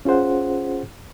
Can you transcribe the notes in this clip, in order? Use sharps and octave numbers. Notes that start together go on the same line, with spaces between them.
C#4 F4 G#4 C5 F#5